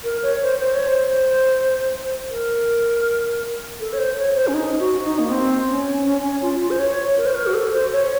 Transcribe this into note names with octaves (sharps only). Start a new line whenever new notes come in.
A#4
C#5
C5
C5
C#5
C5
A#4
A4
C#5
C5
C#5
C5
C#4
D#4
F#4
D#4
A#3
C4
C#4
C#4
C#4
F4
F4
C5
C#5
A#4
C5
A#4
F#4
A4
C5
C#5